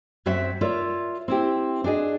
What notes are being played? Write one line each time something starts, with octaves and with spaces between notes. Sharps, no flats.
F#2 F#3 C4 C5 E5 F#5
F4 A#4 C#5 D5 E5
C4 E4 G4
D4 F#4 G#4 D#5